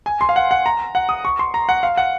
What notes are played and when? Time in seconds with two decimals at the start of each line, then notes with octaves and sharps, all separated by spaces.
0.06 G#5
0.21 C6
0.29 F5
0.36 F#5
0.51 F#5
0.66 A#5
0.95 F#5
1.09 D#6
1.25 C#6
1.39 C6
1.54 A#5
1.69 F#5
1.83 F5
1.97 F#5